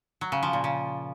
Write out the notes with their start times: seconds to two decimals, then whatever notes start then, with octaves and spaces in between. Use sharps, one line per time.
0.21 F#3
0.32 C#3
0.43 F3
0.53 A#2
0.64 C#3